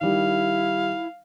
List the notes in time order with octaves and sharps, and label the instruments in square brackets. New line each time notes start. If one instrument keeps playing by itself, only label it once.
[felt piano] D#3 G3 [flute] E4 [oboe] F5